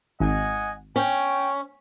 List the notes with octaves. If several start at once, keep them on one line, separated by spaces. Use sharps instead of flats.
G#1 D#5 F#5 G#5
C#4 G5